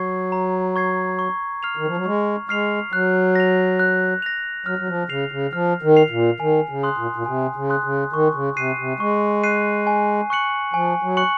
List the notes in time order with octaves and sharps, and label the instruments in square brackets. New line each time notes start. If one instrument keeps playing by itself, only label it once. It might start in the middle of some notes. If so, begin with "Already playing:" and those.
Already playing: [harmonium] F#3 [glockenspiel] C#6 G#6 C7
[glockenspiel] A#5
C#6 G#6 C7
C#6
F6 C7 F7
[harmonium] D#3
F3
F#3
[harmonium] G#3 [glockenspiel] C#6
[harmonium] G#3 [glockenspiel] F6 C7 F7
[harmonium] F#3 [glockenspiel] F#6
[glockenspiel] A#6 F7
F#6
A#6 F7
[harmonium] F#3 [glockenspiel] F6
[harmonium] F#3
F3
[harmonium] C#3 [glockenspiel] C7 F7
[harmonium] C#3
[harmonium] F3 [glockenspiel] F6
[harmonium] D#3
[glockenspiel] C7 F7
[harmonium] A#2
[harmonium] D#3 [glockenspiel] G#5
[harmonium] C#3
[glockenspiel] C6 D#6 F#6
[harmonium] A#2
A#2
[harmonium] C3 [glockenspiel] G#5
[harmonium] C#3
[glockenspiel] C6 D#6 F#6
[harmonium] C#3
[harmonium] D#3 [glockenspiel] C#6
[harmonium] C#3
[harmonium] C3 [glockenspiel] F#6 C7 D#7
[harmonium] C3
[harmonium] G#3 [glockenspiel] C#6
[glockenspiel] F#6 C7 D#7
G#5
C#6 F#6 C#7 F#7
[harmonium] F3 [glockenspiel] G#5
[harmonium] F#3
[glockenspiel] C#6 F#6 C#7 F#7